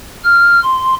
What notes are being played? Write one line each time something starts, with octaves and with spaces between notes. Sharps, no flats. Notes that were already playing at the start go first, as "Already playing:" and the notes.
F6
C6